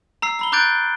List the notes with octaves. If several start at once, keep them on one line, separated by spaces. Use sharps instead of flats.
A#5 E6 C7
A#5 B5 G7
A#5 D6 F#6 G6 A6 D7